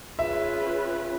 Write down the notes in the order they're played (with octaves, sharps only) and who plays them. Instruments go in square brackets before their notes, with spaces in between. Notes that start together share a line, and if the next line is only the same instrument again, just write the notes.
[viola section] C#4 F4 G#4 B4 [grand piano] E5